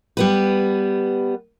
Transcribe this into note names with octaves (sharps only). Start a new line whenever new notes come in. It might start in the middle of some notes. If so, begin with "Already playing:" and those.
G3 B3 B4